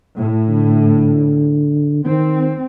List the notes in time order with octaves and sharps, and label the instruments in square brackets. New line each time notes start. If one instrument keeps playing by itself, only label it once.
[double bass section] A2
[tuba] D3
[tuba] D#3 [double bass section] C4